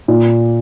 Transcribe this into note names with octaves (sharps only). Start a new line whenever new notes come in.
A#2